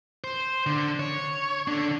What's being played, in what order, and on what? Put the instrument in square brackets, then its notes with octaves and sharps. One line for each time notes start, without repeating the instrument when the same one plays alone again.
[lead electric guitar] C5
D3
C#5
D3 D4